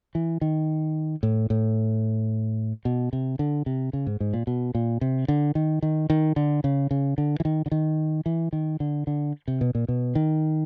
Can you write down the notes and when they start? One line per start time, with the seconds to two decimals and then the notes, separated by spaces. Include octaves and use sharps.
0.15 E3
0.41 D#3
1.23 A2
1.50 A2
2.85 B2
3.13 C3
3.39 D3
3.66 C3
3.93 C#3
4.07 G#2
4.20 G#2
4.34 A#2
4.47 B2
4.75 A#2
5.01 C3
5.28 D3
5.55 D#3
5.82 D#3
6.10 D#3
6.36 D3
6.64 C#3
6.91 C#3
7.18 D3
7.40 E3
7.45 D#3
7.66 D3
7.71 D#3
8.26 E3
8.53 D#3
8.80 D3
9.07 D3
9.48 C3
9.61 B2
9.75 A#2
9.88 B2
10.15 D#3